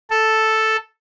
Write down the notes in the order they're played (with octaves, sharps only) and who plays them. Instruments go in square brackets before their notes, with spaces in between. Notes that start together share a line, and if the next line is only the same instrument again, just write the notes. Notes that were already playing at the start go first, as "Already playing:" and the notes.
[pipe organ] A4